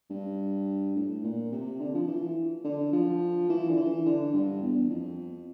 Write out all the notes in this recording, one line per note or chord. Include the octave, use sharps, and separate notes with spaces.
G2
A2
A#2
C3
D3
F3
E3
D3
F3
E3
D3
E3
D3
G2
E2
F2